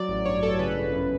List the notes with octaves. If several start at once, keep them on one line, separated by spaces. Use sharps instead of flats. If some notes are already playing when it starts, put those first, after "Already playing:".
Already playing: F#3 D5
A1
G2 C#5
A1 A4
C#3 B4
G1
F#2